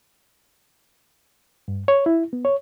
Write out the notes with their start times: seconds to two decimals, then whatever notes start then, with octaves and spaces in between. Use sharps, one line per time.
1.68 G2
1.88 C#5
2.06 E4
2.33 B3
2.45 C#5